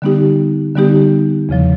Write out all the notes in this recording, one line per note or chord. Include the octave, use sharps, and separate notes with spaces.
D3 G3 B3 D#4 G4
D3 G3 B3 D#4 G4
E2 C#3 F3